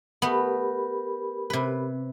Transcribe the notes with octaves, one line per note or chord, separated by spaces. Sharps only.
A3 B3 G4 A#4 B5
C3 B4